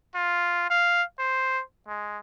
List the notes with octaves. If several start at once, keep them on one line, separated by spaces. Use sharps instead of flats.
F4
F5
C5
G#3